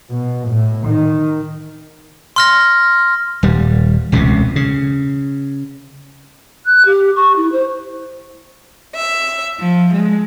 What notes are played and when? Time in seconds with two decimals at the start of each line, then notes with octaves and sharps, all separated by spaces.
0.11 B2
0.48 A2
0.86 D#3
2.36 C6 F6 A#6
3.43 D#1 G3
4.12 E1 C#2 A2 C3
4.56 C#3
6.65 F#6
6.85 G4
7.16 C#6
7.36 E4
7.52 C5
8.95 E5
9.58 F3
9.94 G#3